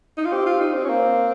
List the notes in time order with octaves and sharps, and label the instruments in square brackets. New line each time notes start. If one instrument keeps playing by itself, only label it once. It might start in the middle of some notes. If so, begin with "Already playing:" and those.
[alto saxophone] D#4
F4
[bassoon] C4 [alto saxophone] G4
[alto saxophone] F4
D#4
C4
C#4
[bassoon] A#3 [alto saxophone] C4